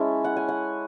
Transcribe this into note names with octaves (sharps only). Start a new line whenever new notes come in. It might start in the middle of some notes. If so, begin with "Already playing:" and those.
Already playing: G#3 C#4 E4 E5 A5
F#5
G#5
F#5